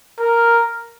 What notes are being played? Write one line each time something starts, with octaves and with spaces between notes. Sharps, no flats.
A#4